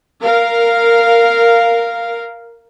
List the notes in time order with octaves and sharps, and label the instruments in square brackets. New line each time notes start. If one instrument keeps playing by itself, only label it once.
[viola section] A#4 F5